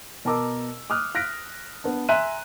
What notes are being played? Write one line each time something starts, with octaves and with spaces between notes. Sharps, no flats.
B2 A#4 A5 A#5 D6 E6
D6 D#6 F6 F#6
F6 F#6 A#6 B6 D7
B3 D4
E5 G#5 A#5 C6 F#6 D#7